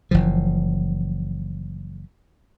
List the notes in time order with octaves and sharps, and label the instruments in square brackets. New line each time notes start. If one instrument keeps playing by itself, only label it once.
[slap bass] F#1 E3 F3